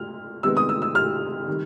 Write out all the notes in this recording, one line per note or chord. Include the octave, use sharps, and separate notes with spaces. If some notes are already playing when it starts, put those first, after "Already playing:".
Already playing: G#3 F6
C3 D#3 G#3 B3 E6
D#6
E6
E6
F6
D#3 G3